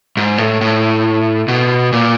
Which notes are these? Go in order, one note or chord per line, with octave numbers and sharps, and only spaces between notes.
G#2
A2
A2
B2
A#2